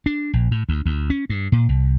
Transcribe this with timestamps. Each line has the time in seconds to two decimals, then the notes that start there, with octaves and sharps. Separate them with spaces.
0.06 D4
0.33 A#1
0.51 A2
0.69 D2
0.86 D2
1.10 C#4
1.30 G2
1.52 A#2
1.69 C2